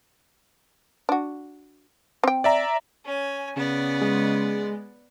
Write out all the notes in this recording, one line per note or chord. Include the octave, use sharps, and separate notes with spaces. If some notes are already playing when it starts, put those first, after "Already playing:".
D4 F#4
C4 G5
D5 E5 A#5
C#4 G#5
C#3 B3 D5
G#3